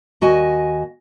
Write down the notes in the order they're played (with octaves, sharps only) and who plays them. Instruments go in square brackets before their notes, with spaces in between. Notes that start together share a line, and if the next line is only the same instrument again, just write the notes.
[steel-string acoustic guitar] D#2 F#4 D#5 G#5